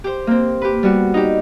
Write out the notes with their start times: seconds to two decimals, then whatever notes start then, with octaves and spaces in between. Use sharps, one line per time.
0.04 G4 C5
0.27 A#3 C4
0.62 G4 B4
0.83 G3 B3 F#4
1.14 D#4 G4